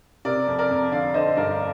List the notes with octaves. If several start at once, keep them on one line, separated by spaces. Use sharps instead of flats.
C3 A#4 D5
F2
A#4 D5
F2
D3 D5 F5
D3 C5 D#5
G2 A#4 D5